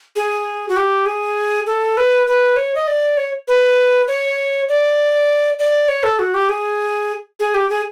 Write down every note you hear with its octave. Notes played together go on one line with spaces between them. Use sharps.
G#4
F#4
G4
G#4
A4
B4
B4
C#5
D#5
D5
C#5
B4
C#5
D5
D5
C#5
A4
F#4
G4
G#4
G#4
G4
G#4